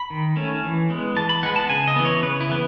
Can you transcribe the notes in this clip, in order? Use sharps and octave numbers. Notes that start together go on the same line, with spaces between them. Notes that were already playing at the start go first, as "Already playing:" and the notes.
Already playing: B5
D#3
A3 C#4
E3
G#3 B3
E3 A5
B5
G#3 B3 F#5
A5
C#3 G#5
D#5
E3 B3
C#5
C#3 B4
E4
E3 B3